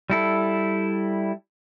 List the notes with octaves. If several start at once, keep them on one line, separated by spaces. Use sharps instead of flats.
G3 E4 A4